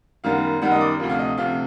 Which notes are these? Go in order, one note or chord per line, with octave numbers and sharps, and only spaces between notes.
F#2 D#3 G3 B3 F5
F#2 D#3 G3 B3 F#5
D#5
D5
D2 C3 F3
F5
D#5
D2 C3 F3 F5